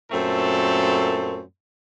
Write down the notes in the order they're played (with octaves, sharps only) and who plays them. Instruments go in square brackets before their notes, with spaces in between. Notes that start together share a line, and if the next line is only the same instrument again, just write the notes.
[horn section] F#2 A#2 A3 C4 A4